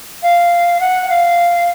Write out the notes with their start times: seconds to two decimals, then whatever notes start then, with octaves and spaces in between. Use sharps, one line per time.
0.22 F5
0.79 F#5
1.09 F5